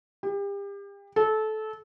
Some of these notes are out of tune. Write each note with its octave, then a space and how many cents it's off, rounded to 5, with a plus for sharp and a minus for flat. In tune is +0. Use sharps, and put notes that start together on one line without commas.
G4 +35
A4 -20